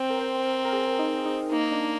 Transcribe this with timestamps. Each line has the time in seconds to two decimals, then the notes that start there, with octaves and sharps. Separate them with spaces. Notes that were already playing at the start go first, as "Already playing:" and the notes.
Already playing: C4 G5
0.10 A#4
0.19 C5
0.46 A#4
0.65 A#4
0.73 G#4
0.99 D#4
1.26 D#4
1.52 A#3 D#4
1.72 D4